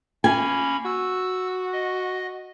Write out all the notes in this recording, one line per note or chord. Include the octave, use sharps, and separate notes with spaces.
A#3 C#4 G#5 B5
F#4 E6
D#5